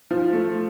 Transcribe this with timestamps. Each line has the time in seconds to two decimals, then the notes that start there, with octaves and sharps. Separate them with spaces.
0.11 F3
0.33 A3